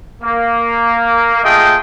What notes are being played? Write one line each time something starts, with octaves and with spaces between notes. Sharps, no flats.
A#3
A3 F4 G#4 D#5 G5